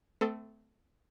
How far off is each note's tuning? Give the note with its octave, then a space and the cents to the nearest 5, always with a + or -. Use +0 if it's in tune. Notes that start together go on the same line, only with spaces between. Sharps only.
A3 +0 C4 -35 A4 +15